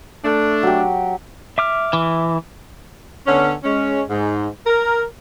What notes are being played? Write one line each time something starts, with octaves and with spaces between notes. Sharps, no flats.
A3 D4
F#3 G4
E5 D6 F6
E3
D3 B3 C#4
G#3 C#4
G#2
A#4